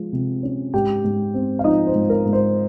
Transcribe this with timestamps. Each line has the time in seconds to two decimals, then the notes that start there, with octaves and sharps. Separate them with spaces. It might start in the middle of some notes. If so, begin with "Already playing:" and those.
Already playing: F3 G#3
0.13 C3
0.43 C#4
0.74 G#2 G4 G5
1.04 G#2
1.34 C4
1.59 F5
1.64 F3 D#4 D#5
1.87 C5
1.94 G#2
2.10 A#4
2.25 G#2
2.33 C5